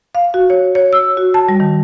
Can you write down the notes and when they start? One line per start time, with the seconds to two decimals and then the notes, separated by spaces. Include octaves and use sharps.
0.15 F5
0.34 F#4
0.50 C#5
0.75 C#5
0.93 E6
1.17 F#4
1.34 A5
1.49 G3
1.60 D#3